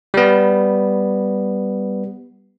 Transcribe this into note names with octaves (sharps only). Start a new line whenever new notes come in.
G3 B3